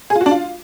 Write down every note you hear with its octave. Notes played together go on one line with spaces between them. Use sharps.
G#4
F4
F#4
D4
F4